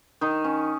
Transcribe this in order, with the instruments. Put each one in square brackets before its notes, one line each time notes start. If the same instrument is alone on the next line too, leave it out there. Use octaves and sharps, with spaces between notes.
[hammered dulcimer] D#3 D#4
C#4